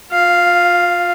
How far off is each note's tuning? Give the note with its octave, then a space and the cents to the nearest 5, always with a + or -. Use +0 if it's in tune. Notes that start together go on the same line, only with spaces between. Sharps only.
F4 +25 F5 +0